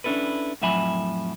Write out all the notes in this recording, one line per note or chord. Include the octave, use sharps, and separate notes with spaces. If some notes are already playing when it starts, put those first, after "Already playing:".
C#4 D4 E4 A4 B4
F2 A2 F#3 E5 G#5 B5